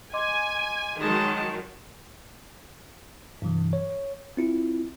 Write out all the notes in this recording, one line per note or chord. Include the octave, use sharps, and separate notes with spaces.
D#5 G#5 C6 D6
D#3 F#3 G#3 A5
G2 C3 E3 F#3
C#5
C4 E4 F4